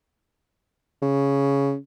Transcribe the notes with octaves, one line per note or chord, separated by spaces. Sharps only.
C#3